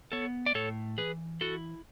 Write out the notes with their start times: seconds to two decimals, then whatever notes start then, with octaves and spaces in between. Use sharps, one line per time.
0.12 B3 A4 C#5
0.46 D5
0.55 A2 A4 C#5
0.98 E3 G#4 B4
1.41 E4 F#4 A4